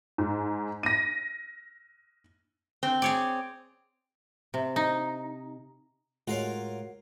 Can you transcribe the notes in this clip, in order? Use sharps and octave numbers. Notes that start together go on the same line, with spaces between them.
G#2
A#6 D#7
C4
G#4 C#5 D5
C3
D#4
A2 G#3 F4 F#4 A#4 C#5 F5